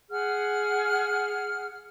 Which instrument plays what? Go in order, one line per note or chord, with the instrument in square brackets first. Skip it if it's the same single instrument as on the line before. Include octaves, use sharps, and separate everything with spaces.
[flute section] G#4 F#5 F6